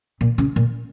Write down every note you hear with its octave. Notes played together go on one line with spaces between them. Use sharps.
A#2
C#3
A#2